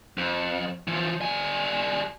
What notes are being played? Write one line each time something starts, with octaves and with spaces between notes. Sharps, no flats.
F2
E3 F3
G3 G#5